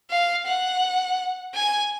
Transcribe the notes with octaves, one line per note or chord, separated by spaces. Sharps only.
F5
F#5
G#5